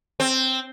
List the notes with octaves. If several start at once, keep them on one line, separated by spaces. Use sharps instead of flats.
C4